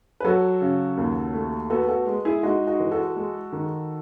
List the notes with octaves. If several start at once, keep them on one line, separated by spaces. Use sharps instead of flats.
B4
F#3 F#4 A4
C#3
D#2
A3
B3 F#4 A4
F#4 A4
G#3
E4 G#4
G#3 D#4 F#4
D#4 F#4
E3
F#4 A4
G#3
D#3